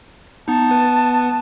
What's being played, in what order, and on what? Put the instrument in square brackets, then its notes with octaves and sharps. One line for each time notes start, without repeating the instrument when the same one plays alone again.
[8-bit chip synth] B3 D#4 [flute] A5
[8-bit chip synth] B3 B4